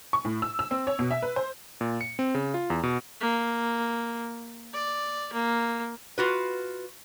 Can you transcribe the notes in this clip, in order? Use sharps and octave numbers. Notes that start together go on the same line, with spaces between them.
C#6
A2
E6
E6
C4
C#5
B2
E5
B4
C5
A#2
C#7
C4
C#3
F4
E2
B2
A#3
D5
A#3
F4 F#4 B4